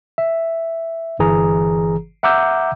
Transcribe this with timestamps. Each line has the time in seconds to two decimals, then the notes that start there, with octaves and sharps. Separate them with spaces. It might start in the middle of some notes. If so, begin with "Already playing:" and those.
0.18 E5
1.19 G1 E3 G#4 A#5
2.23 E5 F#5 A#5 D6 E6 G6